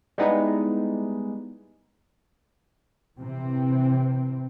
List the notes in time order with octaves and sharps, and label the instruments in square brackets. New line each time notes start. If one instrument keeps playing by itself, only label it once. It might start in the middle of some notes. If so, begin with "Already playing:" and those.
[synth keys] G3 G#3 B3 D#4 E4 G#4
[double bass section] C3 E3 C4